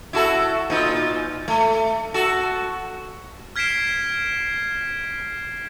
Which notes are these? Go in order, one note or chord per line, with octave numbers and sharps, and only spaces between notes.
E4 F#4 A4
A#2 D#4 F4
A3
F#4 A4
F6 G#6 B6 C7 D7 E7